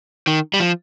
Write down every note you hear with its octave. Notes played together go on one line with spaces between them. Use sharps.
D#3
G3
F3